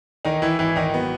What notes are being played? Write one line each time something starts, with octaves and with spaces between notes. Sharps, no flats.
D#3 E3 D#4
E3 E4
G#1 E3 E4
D#3 D#4
F#3 B3